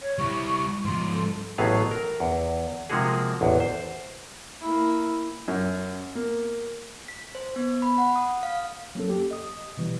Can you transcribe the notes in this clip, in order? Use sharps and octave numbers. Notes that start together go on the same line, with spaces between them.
C#5
G3 E4 C#6
G#2 F3 C6
A4
A1 A2 F#3 B3 G#4 F5
A#4
E2
C3 F3 G#3 A#3 F#4 G#4
A1 E2
C5
A#3 E4
F#2
A#3
B6
C5
B3
B5
F#5
D#6
F5
F#3 A#3 C#4 A4
G4
D#5 D#6
B2 E3 G3